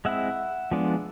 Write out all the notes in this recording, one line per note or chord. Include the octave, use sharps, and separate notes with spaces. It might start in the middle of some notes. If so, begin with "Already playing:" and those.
G#3 C4 E4 E5 F#5
F3 G#3 B3 D4